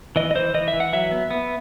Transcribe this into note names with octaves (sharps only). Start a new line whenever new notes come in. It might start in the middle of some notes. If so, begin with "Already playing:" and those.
E3 D#5
D#5
E3 C5
E3 D#5
E5
E3
F#5
F#3 E5
B3
B3